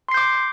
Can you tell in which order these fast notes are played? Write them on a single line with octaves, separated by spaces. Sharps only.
C6 C7 G6 D6